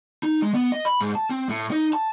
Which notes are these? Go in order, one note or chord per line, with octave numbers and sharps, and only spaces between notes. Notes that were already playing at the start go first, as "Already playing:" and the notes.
D#4
G#3
B3
D#5
B5
G#2
A5
C4
A2
D#4
A5